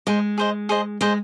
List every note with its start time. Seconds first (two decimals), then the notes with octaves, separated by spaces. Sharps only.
0.07 G#3 G#4 C5 D#5
0.38 G#4 C5 D#5
0.69 G#4 C5 D#5
1.01 G#3 G#4 C5 D#5